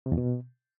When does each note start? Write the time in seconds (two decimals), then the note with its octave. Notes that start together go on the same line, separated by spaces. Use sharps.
0.06 C3
0.12 E2
0.18 B2